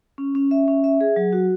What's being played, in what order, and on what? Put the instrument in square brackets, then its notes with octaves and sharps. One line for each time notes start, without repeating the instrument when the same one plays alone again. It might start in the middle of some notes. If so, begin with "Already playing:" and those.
[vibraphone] C#4
C#4
E5
C#4
E5
G#4
F#3
F#4